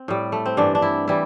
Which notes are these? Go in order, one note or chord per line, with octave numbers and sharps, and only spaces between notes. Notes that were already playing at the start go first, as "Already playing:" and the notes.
Already playing: C4
A2 G3
A3
C4
G2 E3 G3 D4
D4
E4
E3 G3 E4